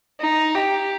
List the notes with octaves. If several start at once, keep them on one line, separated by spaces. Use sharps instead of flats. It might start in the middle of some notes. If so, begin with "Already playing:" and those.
D#4
G4